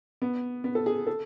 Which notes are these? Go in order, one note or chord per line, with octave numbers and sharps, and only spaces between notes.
B3
B3
A4
G#4
A4